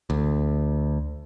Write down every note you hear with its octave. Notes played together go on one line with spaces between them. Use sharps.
D2